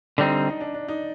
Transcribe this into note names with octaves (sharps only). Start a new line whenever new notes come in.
D3 G3 C4 D4 D#4
D#4
D4
D4
D#4